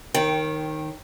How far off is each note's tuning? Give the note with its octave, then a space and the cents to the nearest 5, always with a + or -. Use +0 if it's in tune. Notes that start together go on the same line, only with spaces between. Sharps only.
D#3 +0 C#5 -35 G5 +0